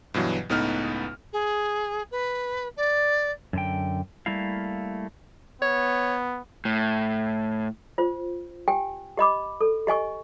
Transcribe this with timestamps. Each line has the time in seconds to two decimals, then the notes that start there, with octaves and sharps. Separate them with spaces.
0.14 G2 B2 E3 F#3
0.49 C#2 A2 B3 D#4 B4 F6
1.33 G#4
2.11 B4
2.76 D5
3.53 F#2 D3 G5
4.26 G3 A3 A#3 E4 F5
5.62 B3 C#5
6.65 A2
7.98 F4 C5
8.68 G4 G5 G#5
9.17 G4 D#5 B5 D6
9.61 A4
9.87 G4 D#5 G#5 C#6